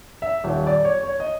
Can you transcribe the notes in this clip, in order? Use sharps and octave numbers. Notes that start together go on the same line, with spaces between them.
E5
D#1
D5
C#5
C#5
D#5